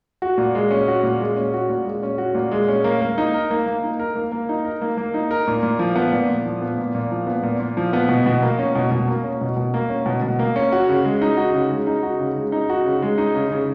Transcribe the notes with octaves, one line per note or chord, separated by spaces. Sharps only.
F#4
A#2
G#3
C#4
F#4
A#2
G#3
C#4
F#4
A#2
G#3
C#4
F#4
A#2
G#3
C#4
A#3
A#3
D#4
A#4
A#3
A#3
D#4
A#4
A#3
A#3
D#4
A#4
A#3
A#3
D#4
A#4
A#2
A#2
F3
B3
A#2
A#2
F3
B3
A#2
A#2
F3
B3
A#2
A#2
F3
B3
B2
B2
A#3
C#4
B2
B2
A#3
C#4
B2
B2
A#3
C#4
B2
B2
A#3
C#4
F#4
C#3
G#3
D#4
F#4
C#3
G#3
D#4
F#4
C#3
G#3
D#4
F#4
C#3
G#3
D#4
C#3
C#3